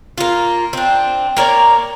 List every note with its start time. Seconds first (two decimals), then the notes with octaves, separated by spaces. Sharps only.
0.18 A#3 F4
0.73 C4 D4
1.37 A#3 A#4 C#5 D5